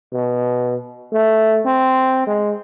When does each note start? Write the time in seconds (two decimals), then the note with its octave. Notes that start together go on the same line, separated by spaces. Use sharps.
0.12 B2
1.13 A3
1.66 C4
2.27 G#3